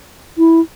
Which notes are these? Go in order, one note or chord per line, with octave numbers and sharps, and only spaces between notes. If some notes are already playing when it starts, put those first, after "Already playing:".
E4